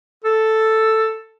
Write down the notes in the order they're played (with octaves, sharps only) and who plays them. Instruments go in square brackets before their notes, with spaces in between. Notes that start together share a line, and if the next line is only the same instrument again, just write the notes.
[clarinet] A4